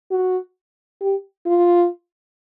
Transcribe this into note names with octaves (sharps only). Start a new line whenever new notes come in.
F#4
G4
F4